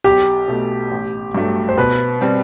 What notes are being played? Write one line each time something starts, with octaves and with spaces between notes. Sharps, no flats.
B1 G4
B2 A3
A1
G2 F#3 A3
C5
B2 B4
G3 C4